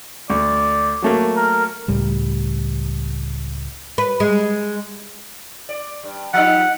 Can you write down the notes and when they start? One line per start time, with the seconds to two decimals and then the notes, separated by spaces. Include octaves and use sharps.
0.30 D2 D5
1.02 F#3 A3 A#3
1.36 A#4
1.88 C#2 A2 G3
3.98 B4
4.20 G#3
5.69 D5
6.03 G2
6.34 F3 G3 D#4 F#5